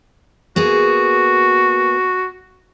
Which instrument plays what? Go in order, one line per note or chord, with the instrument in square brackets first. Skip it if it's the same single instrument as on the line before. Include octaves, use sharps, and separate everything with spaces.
[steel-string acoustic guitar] A#3 B3 G#4 [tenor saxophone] F#4